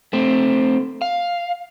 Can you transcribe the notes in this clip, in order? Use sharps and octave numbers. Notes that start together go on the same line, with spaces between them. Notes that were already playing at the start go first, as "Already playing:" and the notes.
A3 C4
F5